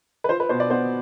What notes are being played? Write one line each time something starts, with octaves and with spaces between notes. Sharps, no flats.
B4
F4 C5
B4
B2 C5
D5
B3 C5